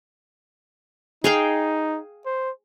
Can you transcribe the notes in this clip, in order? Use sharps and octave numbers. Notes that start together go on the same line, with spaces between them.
D#4 G#4 F5 G5
C5